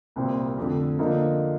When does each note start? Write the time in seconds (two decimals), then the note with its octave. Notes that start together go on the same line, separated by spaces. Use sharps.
0.16 C2 A#2 G3 C4
0.57 F2 D3 A3
0.98 D3 F3 A#3 D#4